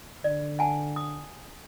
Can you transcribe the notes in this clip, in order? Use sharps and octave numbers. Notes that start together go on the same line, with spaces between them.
D3 D5
F#5 G#5 A5
D#6